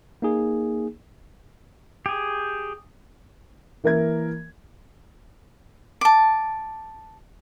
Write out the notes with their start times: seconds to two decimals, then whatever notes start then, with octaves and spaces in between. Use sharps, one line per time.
0.22 A#3 D#4 G#4
2.06 G4 G#4
3.84 E3 A#3 A#4 E5 G#6
6.01 A5 D6